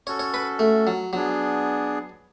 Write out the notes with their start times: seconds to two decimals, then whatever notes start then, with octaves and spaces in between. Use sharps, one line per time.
0.07 C#4 F#4 A4 C#5
0.19 C#5
0.34 B4
0.59 A3
0.87 F#3
1.13 F#3 B3 D4 G#4